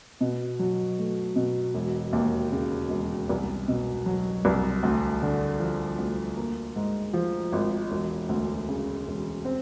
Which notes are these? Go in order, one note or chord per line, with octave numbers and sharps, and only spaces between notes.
B2
F#3
A3
B2
E1
D#2
C#3
E1
C2
B2
F#3
C2
D2
D3
F3
D2
A#3
G#2
F3
G#1
E1
D2
C#3
E1
C4